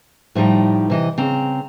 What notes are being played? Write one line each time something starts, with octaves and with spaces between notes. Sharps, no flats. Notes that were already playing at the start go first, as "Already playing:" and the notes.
A2 F3 G3 D#4 G5
C3 E3 D#5
C#3 C4 A#5